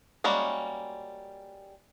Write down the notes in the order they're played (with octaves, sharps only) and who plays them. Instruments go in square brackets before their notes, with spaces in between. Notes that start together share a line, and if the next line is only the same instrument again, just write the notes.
[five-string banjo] G3 G#3 A#3 C#4 F#4